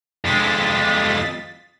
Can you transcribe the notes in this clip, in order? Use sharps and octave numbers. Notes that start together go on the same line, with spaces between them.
F2 G#3 A6 B6